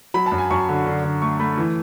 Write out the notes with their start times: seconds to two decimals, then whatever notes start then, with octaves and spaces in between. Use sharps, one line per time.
0.14 F#3 B5
0.26 A5
0.32 F#2
0.38 G#5
0.50 F#2 C#6
0.69 D3
0.86 D3
1.04 D3
1.22 A3 C#6
1.40 A3 B5
1.57 E3